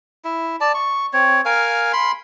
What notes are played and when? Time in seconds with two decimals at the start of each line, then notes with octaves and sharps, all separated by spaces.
0.25 E4
0.61 D5 A5
0.74 C#6
1.13 C4 C#5
1.45 A#4 F5 G#5
1.93 B5 C6